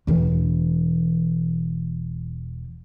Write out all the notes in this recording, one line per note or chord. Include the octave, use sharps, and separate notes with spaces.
E1 E3